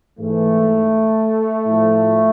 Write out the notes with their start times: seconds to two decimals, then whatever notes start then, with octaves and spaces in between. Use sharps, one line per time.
0.19 G#2 E3 A3
1.66 A2 F3